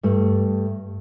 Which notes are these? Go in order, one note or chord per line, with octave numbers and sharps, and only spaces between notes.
G2 A3